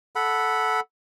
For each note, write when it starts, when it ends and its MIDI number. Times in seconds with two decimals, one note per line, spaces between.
0.16 0.80 69
0.16 0.80 78
0.16 0.80 83